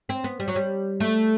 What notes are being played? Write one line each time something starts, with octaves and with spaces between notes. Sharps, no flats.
C4
B3
G3
F#3
G3
A3